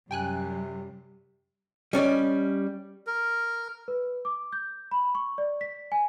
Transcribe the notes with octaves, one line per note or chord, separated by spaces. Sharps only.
F#2 C3 G3 G5 G#5 F#6
G3 C#4 D5 D#5
A#4
B4
D6
G6
B5
C#6
D5
B6
G#5